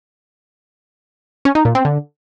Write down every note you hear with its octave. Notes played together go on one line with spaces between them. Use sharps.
C#4
D#4
A#2
C4
D3